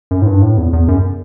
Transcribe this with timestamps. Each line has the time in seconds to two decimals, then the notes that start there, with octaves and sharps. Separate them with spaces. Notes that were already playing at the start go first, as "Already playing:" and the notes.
0.11 F#2
0.22 A2
0.26 G2
0.42 A2
0.58 E2
0.73 E2
0.88 F#2